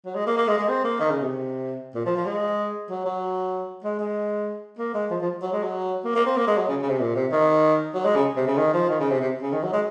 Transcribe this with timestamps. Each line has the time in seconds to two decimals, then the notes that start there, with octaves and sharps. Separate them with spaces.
0.05 F#3
0.15 G#3
0.27 A#3
0.37 A#3
0.48 G#3
0.58 G#3
0.69 C4
0.84 A#3
1.00 D#3
1.10 C#3
1.21 C3
1.95 A#2
2.06 F3
2.16 F3
2.26 G#3
2.90 F#3
3.05 F#3
3.84 G#3
4.00 G#3
4.78 A#3
4.94 G#3
5.10 F3
5.21 F3
5.42 F#3
5.53 G#3
5.63 F#3
6.05 A#3
6.15 A#3
6.26 C4
6.36 A#3
6.47 G#3
6.58 F#3
6.68 C#3
6.82 C#3
6.89 C3
7.00 A#2
7.15 C3
7.32 D#3
7.94 F#3
8.05 G#3
8.16 C#3
8.36 C3
8.47 C#3
8.58 D#3
8.73 F3
8.89 D#3
9.00 C#3
9.10 C3
9.21 C3
9.42 C#3
9.52 D#3
9.63 F#3
9.73 G#3